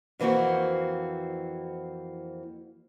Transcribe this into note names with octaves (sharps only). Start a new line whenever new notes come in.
F2 E3 A#3 C4 F#4